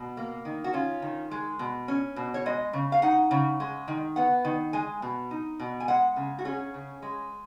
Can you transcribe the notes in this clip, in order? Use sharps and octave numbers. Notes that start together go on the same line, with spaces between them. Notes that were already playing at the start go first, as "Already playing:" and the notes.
Already playing: B2
A#3
D#3
F#4
C#4 F4
D#3
G#3
B2
C#4
B2
C#5
G#3 D#5
C#3
F5
D#4 F#5
C#3
G#3
D#3
B3 F#5
D#3
G#3 G#5
B2
D#4
B2
G#5
G#3 F#5
C#3
F#4
C#4 G#4
C#3
G#3